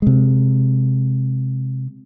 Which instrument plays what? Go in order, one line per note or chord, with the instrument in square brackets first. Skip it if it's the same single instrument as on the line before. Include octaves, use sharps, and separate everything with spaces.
[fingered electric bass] C3 G#3